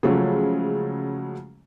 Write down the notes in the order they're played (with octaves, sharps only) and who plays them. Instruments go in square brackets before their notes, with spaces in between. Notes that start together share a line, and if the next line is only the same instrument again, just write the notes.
[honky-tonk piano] C#3 G#3 [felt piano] F3 F#3 A3